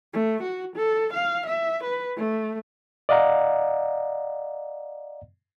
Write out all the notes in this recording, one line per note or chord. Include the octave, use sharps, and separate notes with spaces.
A3
F#4
A4
F5
E5
B4
A3
D5 D#5 F5 F#5 A#5